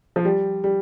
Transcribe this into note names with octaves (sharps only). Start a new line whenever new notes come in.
F3
G3
G3